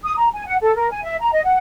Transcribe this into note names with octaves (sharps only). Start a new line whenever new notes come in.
D#6
A#5
G#5
F#5
A4
A#4
G#5
E5
A#5
D#5
F#5